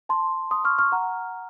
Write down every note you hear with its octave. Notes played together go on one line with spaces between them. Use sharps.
A5 C6
C6 D#6
C#6 F6
C#6 F6
F#5 A#5